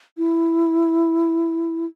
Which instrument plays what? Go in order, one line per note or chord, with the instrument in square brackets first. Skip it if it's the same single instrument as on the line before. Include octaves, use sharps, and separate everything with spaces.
[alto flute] E4